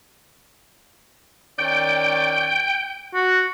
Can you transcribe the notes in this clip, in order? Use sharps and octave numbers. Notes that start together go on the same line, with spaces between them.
D#3 C#4 D5 G5
F#4